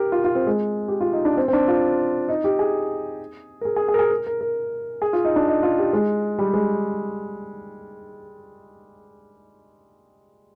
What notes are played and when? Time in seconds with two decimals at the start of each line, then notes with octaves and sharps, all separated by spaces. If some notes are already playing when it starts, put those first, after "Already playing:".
Already playing: G4 A#4
0.12 F4
0.24 F4
0.35 C4
0.47 G#3
0.88 G4
1.01 F4
1.13 D#4
1.25 D4
1.37 C4
1.48 C4
1.53 D4
1.68 F4
2.29 D#4
2.44 G4
2.59 G#4
3.61 A#4
3.65 G#4
3.76 G#4
3.88 G#4
3.94 A#4
3.99 G#4
4.11 A#4
4.27 A#4
4.41 A#4
5.02 G#4
5.13 F4
5.25 D#4
5.36 D4
5.48 D#4
5.63 F4
5.78 G4
5.93 G#3
6.39 G3
6.54 G#3